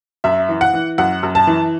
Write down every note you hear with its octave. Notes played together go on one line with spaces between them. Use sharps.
F#2 E5
E3
F#5
E3
F#2 F#5
F#2
A5
E3